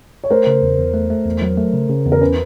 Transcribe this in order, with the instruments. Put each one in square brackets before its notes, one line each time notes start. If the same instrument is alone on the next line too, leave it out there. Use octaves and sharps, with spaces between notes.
[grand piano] C#5
[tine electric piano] A3 [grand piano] A#4 C5
[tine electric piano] C#3
E2
E2
A3
A3
E2
F#3
A3
C#3
C#3
E2
[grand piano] A#4
[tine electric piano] C#4 [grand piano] B4